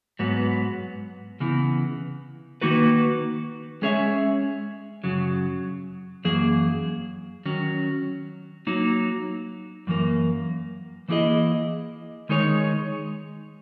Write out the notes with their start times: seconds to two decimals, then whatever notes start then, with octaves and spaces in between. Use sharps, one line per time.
0.19 G#2 F#3 B3
1.40 C#3 E3 B3
2.61 D#3 A#3 D#4 F#4 B4
3.82 G#3 C#4 G#4 C#5 E5
5.04 F#2 C#3 F#3
6.25 F#2 E3 A#3 G#4
7.45 D#3 F#3 C#4
8.67 F#3 A#3 D#4
9.87 F#2 E3 A#3
11.08 E3 A#3 E4 G#4 D#5
12.29 D#3 G#3 D#4 G#4 C#5